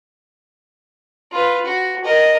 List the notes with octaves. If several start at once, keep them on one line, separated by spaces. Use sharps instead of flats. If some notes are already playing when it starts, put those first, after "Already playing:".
F4 B4
F#4
A#4 D#5